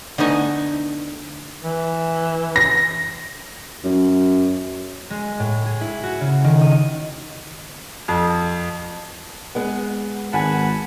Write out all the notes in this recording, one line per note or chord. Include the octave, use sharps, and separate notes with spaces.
D3 A3 B3 D#4 G#5
E3
A#6
F#2
G#3
A2
G#4
E4
F#4
C#3
D#3
D#6
F2
G#3 B3
G#1 F#5 G#5 A5 B5